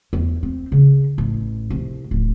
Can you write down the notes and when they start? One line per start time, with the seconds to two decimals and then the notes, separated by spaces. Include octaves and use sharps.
0.13 E2
0.43 C4
0.72 C#3
1.18 A1
1.70 C2
2.11 D1